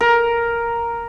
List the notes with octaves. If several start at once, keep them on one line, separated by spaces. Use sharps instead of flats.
A#4